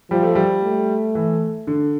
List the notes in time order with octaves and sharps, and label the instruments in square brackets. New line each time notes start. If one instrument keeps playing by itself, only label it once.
[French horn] F3 [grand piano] G3
[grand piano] A3
G3
[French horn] A3
[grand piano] E3
D3